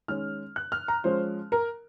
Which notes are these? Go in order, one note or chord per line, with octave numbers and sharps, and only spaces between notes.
D#3 G#3 C#4 F6
F#6
F6
A#5
F3 G#3 C#4 C5
A#4